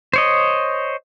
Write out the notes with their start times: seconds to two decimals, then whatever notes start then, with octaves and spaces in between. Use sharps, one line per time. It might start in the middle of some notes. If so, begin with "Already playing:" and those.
0.13 C5 C#5 D#5